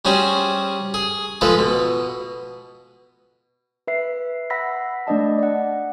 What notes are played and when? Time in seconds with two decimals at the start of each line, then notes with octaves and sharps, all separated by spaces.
0.05 G3 C#4 F#4 G#4 C5
0.94 G#4
1.41 F3 G#3 A4 B4
1.59 B2
3.87 B4 E5 C7
4.50 F#5 B5 E6 A#6 B6
5.07 A3 D4 D5 D#5 A5
5.39 D5 F#5